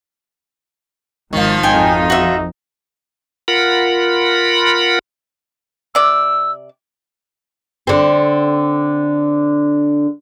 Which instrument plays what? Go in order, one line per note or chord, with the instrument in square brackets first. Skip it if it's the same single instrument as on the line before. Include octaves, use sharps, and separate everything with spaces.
[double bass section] G#1 [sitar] D#3 F3
[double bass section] G#1 F2 [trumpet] D#4 [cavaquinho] G5 G#5
[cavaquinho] F#4 E5
[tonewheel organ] F4 A#4 F#5 B5
[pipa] C3 D5 [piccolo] E6
[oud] D3 C4